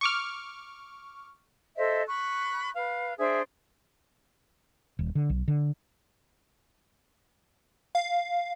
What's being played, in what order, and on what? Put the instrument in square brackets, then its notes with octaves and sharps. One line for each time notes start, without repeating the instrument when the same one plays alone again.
[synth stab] C#6 D6 F6
[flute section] A4 C5 D#5 E5
B5 C#6 F#6
B4 F5
D4 G#4 C5 E5
[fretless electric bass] D#1
D3
B1
D3
[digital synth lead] F5